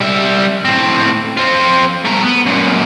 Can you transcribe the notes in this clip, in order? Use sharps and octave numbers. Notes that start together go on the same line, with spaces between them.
G3 E5
A2 C4
C4 F4
A3 A#4
B3
F#2 A#2